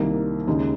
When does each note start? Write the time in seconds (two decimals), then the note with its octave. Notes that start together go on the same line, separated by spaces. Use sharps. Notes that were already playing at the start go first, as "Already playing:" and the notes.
Already playing: C2 C3 D#3 A#3
0.47 D#2 C#3 G#3 D#4